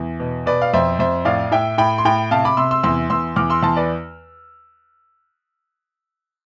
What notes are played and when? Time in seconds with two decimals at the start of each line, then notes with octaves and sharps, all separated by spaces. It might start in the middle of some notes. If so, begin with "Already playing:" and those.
Already playing: E2
0.20 B2
0.46 B2 B4 D5
0.62 F5
0.74 F2 C5 E5
0.99 F2 C5 E5
1.25 A2 D5 F5
1.52 A2 E5 G5
1.78 A2 G5 B5
1.98 C6
2.05 A2 G5 B5
2.31 C3 F5 A5
2.45 B5 D6
2.57 C3 C6 E6
2.71 C6 E6
2.83 E2 C6 E6
3.10 E2 C6 E6
3.36 E2 D6 F6
3.50 C6 E6
3.63 E2 A5 C6
3.77 B4 D5